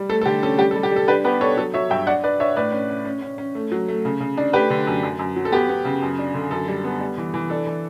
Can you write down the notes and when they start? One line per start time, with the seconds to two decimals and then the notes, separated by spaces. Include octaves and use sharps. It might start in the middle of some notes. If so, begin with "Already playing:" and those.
Already playing: G3
0.09 A3 A4
0.21 A4
0.26 D3 G4
0.42 C#4 A4
0.58 G3 G4
0.71 A4
0.75 G3
0.83 G4
0.92 G3 A4
1.08 D4 G4 B4
1.24 B3 G4 B4
1.41 D4 A4 C#5
1.57 F#3 A4
1.74 F#3 C#5 E5
1.90 G2 E5 G5
2.07 D4 D5 F#5
2.24 D4 B4 D5
2.40 D4 C#5 E5
2.56 A2 B4 D5
2.72 C#4
2.89 C#4
3.05 C#4
3.22 C#4
3.38 C#4
3.55 A3
3.72 F#3
3.88 A3
4.05 C#3
4.20 C#3
4.37 D4
4.53 A3 G4 B4
4.70 D3
4.87 F#2
5.03 F#2
5.19 F#2
5.36 F#3
5.45 A4
5.52 B3 G4
5.69 B3
5.85 C#3
6.02 F#2
6.19 D4
6.34 D3
6.51 F#2 A4
6.68 G3
6.84 B3
7.00 G3
7.18 E3
7.34 E3
7.50 D4 A4
7.67 E3